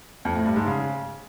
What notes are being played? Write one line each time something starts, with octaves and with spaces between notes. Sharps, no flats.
F2
A2
G2
G#2
C#3